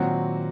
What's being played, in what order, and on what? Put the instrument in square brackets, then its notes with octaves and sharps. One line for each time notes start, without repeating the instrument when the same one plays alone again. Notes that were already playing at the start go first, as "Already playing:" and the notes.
Already playing: [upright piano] A#2 F#3 C4 F#4 [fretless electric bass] D#3